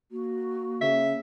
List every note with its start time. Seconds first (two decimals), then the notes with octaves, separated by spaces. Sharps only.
0.11 A#3 F#4
0.81 C#3 E5